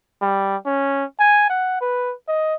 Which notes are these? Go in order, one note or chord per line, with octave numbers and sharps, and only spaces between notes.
G3
C#4
G#5
F#5
B4
D#5